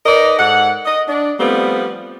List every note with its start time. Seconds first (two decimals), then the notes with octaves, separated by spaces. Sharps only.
0.06 D#4 A#4 B4 D5 D#5
0.39 G#2 A4 F#5
0.86 D#5
1.08 D4
1.39 F3 G3 A3 B3 C4